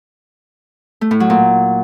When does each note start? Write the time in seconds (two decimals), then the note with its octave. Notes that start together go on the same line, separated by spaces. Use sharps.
1.01 A3
1.11 A2
1.20 F#3
1.30 A#2